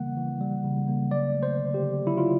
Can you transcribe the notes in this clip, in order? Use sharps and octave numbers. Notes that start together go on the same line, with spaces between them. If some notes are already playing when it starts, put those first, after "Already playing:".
Already playing: C#3 E3 G3 A#3 F#5
E3
G3
C#3
A#3
F#3 D5
A3
C5
D3
G4
D3
F#3 E4
F4